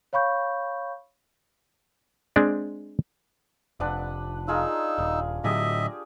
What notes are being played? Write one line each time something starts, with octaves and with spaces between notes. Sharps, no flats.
C#5 F5 B5 C#6 G6
G#3 C4 D4 D5
F1 D4 B4 F#5
D#4 F4 G#4 A#4 E6
D#1
A2 D3 F#3 G4 G#4 D#5 E5